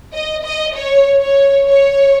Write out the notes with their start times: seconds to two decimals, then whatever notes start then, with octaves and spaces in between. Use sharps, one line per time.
0.14 D#5
0.44 D#5
0.76 C#5
1.21 C#5
1.68 C#5